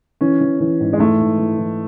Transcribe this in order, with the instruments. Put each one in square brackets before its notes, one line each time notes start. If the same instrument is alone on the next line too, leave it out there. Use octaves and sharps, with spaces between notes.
[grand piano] E3 C#4
E3
E3
G#2
G#3
E3 A3
G#2
E3
E3